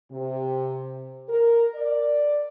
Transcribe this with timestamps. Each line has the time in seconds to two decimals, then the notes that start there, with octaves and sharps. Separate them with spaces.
0.11 C3
1.29 A#4
1.74 D5